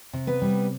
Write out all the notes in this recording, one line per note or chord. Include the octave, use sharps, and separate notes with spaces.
C3
B3 B4
G3